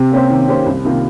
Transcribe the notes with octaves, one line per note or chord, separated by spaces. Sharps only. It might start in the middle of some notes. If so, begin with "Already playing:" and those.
Already playing: C3
A#3 C#4 G4 C5
D#3
A#3 C#4 G4 C5
C2
C3 D#3 A#3 F4